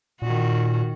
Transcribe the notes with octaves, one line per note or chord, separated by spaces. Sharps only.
A#2 D#3 F#4